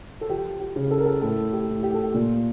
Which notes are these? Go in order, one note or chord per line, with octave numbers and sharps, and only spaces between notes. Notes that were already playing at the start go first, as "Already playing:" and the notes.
A4
F3 G4
G4
C#3
A4
A#4
A4
A2 A4
G4
A2
G4
A4
G4
A#2 F4